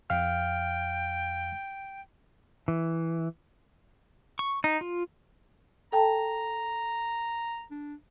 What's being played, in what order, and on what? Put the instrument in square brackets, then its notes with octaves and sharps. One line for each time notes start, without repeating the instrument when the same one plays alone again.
[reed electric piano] F2 F5 F6 [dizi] G5
[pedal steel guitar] E3
C#6
D#4
F4
[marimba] A4 G5 A5 [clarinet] A#5
[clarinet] D4